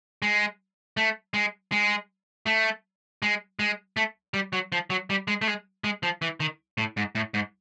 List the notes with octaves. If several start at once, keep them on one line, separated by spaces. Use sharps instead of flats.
G#3
A3
G#3
G#3
A3
G#3
G#3
A3
G3
F#3
F3
F#3
G3
G#3
A3
G#3
G#3
F3
E3
D#3
A2
G#2
A2
G#2